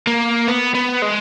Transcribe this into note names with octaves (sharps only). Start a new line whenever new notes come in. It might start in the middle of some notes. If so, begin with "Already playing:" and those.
A#3
B3
B3
G#3